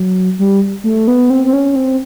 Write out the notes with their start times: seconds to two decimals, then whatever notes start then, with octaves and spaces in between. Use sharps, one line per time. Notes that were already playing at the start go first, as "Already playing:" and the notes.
Already playing: F#3
0.39 G3
0.84 A3
1.07 B3
1.30 C4
1.45 C4
1.53 C#4
1.76 C4